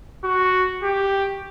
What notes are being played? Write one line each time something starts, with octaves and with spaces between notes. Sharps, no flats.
F#4
G4